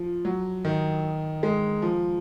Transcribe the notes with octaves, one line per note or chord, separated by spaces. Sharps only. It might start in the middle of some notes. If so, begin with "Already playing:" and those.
Already playing: F3
F#3
D#3
G#3
F3